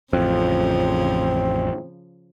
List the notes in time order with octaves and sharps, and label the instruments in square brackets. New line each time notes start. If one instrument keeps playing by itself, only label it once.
[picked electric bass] A1 F2 [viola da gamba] C#3 F3 [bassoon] C4